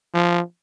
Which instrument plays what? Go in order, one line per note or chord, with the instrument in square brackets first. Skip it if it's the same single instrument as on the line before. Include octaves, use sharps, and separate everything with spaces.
[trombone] F3